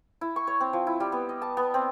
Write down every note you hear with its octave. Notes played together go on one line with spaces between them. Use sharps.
E4
C#6
C#5
C4
F3
E4
G3
B3
D#5
A5
B3
C4